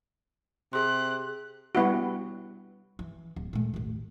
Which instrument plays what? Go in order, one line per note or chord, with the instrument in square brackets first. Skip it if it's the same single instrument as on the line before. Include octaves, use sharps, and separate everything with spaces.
[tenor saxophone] C3 [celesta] G#4 C6 [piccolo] F#6
[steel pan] G3 B3 E4 F#4
[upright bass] E3
D1
A#2 A3
A1 D#2